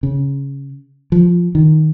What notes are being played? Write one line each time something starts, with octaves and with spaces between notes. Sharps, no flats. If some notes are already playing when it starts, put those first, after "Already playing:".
C#3
F3
D#3